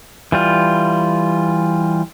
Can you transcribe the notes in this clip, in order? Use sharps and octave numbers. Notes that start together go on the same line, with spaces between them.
E3 G3 F4